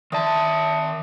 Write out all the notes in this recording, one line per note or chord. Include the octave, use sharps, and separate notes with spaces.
D#3 D5 E5 A5 D#6